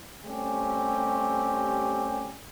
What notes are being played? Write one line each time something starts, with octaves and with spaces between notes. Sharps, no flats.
G3 A3 C4 C#4 G4